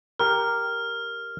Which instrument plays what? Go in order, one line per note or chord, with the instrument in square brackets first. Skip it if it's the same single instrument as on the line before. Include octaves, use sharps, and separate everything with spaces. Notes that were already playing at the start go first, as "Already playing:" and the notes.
[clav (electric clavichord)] G4 A#4 [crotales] F6